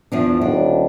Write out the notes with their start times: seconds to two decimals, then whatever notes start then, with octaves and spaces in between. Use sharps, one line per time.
0.12 E2 F3 D4
0.41 D#1 D4